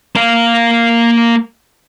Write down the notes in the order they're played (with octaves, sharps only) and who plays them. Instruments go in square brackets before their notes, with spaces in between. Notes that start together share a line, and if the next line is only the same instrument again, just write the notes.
[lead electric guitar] A#3 F5